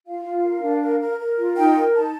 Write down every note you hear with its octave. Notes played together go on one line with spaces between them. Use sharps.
F4 F5
F4
A#4
D4
A#4
A#4
A#4
F4
D#4 G5
A#4
D#4 A5